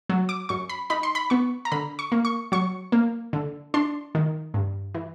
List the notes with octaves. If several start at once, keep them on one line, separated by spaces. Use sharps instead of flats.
F#3
D6
F#2 C#6
B5
D#4 B5
C6
B5
B3 C#6
A#5
D3 B5
C#6
A#3
C#6
F#3 C#6
A#3
D3
D4 C6
D#3
G2
E3